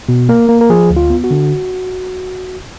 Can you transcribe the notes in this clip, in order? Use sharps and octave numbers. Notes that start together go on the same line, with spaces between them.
B2
A#3 A#4
A#3
A#4
F3 G#4
D2
F4
B3
F#4
D3